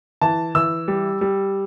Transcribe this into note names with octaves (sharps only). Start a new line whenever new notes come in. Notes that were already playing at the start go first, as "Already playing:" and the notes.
E3 A5
E3 E6
G3
G3